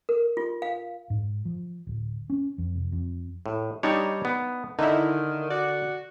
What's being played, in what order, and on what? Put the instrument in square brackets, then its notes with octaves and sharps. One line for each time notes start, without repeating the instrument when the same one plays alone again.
[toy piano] A#4
F4
F5
[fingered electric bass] G#2
F3
D1
C#4
F2
F1
F2
[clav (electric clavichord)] A2
[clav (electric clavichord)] G3 C#5 [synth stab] D4 D#4
[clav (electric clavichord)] B3
[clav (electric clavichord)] D3 [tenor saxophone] D#3 [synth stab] D#4 E4
[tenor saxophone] F#4 [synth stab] D5